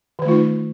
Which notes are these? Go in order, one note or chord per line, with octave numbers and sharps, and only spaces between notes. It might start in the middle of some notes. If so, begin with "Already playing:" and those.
D#3 E3 A3 D#4 F4